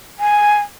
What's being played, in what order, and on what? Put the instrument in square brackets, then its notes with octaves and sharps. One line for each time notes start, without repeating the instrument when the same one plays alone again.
[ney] G#5